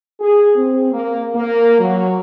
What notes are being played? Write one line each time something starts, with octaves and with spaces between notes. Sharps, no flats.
G#4
C4
A#3
A#3
F#3